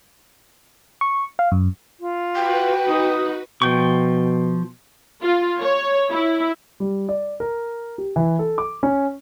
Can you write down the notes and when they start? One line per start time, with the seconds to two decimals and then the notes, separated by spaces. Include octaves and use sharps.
1.01 C#6
1.39 F5
1.52 F#2
2.00 F4
2.36 F#4 B4 G5
2.88 D#4 D#6
3.62 B2 F3 G5 C#6
5.24 F4
5.60 C#5
6.12 E4
6.80 G3
7.09 D5
7.40 A#4
7.98 G4
8.16 E3
8.39 A4
8.58 D6
8.83 C#4